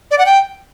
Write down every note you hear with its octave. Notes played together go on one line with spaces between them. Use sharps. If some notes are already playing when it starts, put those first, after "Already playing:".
D5
F#5
G5